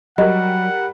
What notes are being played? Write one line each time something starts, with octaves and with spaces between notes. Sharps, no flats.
F#3 G3 A#4 D#5 F#5